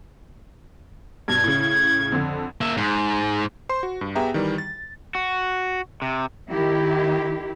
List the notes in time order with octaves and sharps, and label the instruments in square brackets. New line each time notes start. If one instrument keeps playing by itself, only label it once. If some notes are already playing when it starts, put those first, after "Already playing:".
[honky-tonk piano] G2 B2 [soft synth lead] G#6
[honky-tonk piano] A2 C#3
F2 D3
[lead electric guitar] A#3 E5
G#2
[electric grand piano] C5 C6
F#4
G2
B3 G4 G#4 E5 G5 A#5
D#3 E3 G3
A6
[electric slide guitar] F#4
C3
[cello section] D#3 E4 G4